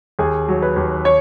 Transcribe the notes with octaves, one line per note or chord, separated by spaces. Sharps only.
D#2 G#4
F#3
B4
D#2
C#5